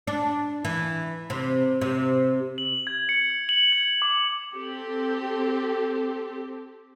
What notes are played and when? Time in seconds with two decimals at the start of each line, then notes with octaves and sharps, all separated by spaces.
0.07 D4
0.65 E3
1.30 C3
1.81 C3
2.58 F#7
2.87 G#6
3.09 C#7
3.30 G#6
3.49 F#7
3.72 G#6
4.02 D6
4.54 C4 G4 A4